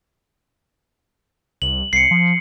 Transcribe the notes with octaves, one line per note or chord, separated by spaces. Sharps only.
C2 F#7
C2 C7 C#7
F3